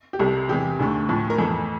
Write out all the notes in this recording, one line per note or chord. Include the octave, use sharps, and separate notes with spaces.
G4
C2 C3 G3 A4
E2 C3 E3 G4
D2 D3 A3
A2 F3 A3
A#4
F2 E3 A3 A4